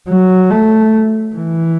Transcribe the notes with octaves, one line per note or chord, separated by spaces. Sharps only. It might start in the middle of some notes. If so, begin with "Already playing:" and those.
F#3
A3
E3